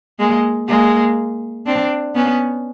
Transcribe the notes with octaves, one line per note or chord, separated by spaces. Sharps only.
G#3 A#3
G#3 A#3
C4 D4
B3 C#4